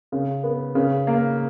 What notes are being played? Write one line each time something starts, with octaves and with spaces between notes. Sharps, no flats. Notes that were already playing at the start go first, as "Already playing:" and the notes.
C#3
B3
C#3
A#3